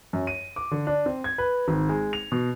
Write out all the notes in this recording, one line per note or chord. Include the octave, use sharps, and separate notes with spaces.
F#2
D#7
D6
D3
D4
C4
G#6
B4
G#1
G#3
F7
B2